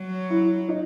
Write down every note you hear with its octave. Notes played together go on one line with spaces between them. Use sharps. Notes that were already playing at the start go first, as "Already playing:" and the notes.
Already playing: F#3
E4
D#4